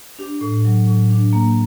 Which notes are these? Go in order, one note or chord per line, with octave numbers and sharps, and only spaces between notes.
D4 G4
A2
F#3
A2
D4
A#3